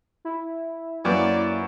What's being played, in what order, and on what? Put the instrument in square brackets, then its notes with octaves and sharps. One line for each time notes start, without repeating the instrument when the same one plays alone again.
[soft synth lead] E4
[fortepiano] F#2 [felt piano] A#3 B4 [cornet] D5